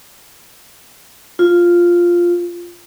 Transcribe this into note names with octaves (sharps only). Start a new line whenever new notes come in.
F4